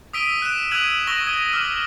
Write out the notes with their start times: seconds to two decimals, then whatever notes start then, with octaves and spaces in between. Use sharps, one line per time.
0.13 D#6 E6 B6 D7 D#7 G7
0.42 F#6 D7 E7
0.71 D#6 E6 F#6 G#6 D#7 F#7
1.07 C#6 D#6 E6 A#6 F#7 G7
1.27 D#6 G#6 G7
1.52 D6 E6 F6